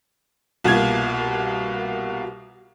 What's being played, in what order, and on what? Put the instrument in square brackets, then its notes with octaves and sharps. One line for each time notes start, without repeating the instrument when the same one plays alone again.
[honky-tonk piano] C2 B2 A#3 F4 G#6